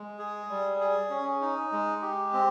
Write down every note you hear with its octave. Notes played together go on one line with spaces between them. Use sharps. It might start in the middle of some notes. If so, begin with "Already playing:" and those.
Already playing: G#3
G#4
G3
G#4
C#4
D#4
G#3
G4
C4